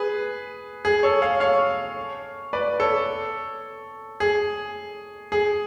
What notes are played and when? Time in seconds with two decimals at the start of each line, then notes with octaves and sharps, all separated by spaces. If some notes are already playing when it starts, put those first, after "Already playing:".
Already playing: G#4 B4
0.85 G#4
1.03 A4 C#5
1.22 C#5 F5
1.40 C#5 F5
2.53 B4 D5
2.80 A4 C#5
4.20 G#4
5.32 G#4